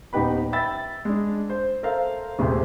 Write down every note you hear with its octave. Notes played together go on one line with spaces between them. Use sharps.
D#1 B3 D#4 G4 B4 B5
E5 G5 B5 E6 A6
G#3 D4
C5
A4 A#4 C5 E5 F5
D#1 C3 A3 G#4 C5 C6